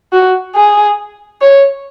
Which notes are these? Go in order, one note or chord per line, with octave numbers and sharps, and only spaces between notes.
F#4
G#4
C#5